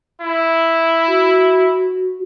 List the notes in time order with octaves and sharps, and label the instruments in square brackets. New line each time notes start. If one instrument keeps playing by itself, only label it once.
[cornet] E4
[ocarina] F#4